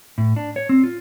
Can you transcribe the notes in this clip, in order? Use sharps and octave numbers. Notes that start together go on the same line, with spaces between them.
A2
D4
C#5
C4
F4